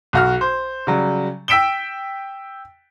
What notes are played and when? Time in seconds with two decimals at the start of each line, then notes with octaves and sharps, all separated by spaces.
0.13 B1 F#4 F6
0.41 C5
0.87 C#3 F#3 G3
1.48 G5 E6 B6 D7 E7 G7